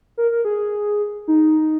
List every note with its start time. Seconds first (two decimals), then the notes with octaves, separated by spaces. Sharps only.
0.17 A#4
0.31 A#4
0.45 G#4
1.28 D#4